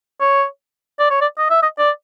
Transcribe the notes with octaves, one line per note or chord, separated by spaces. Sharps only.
C#5
D5
C#5
D5
D#5
E5
D#5
D5